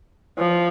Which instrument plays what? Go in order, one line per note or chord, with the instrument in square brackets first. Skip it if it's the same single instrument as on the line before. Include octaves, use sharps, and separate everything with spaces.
[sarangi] F3